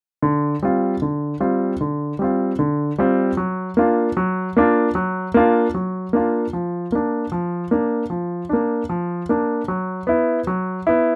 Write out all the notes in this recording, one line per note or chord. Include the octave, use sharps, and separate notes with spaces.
D3
G3 C4 F4
D3
G3 C4 F4
D3
G3 C4 F4
D3
G3 C4 F4
F#3
A#3 D4 F4
F#3
A#3 D4 F4
F#3
A#3 D4 F4
F#3
A#3 D4 F4
F3
A#3 D4
F3
A#3 D4
F3
A#3 D4
F3
A#3 D4
F#3
B3 E4
F#3
B3 E4